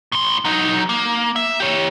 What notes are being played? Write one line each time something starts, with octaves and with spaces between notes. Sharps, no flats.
A2 C6
F#3 D#4
A#3
E5
G4 C#5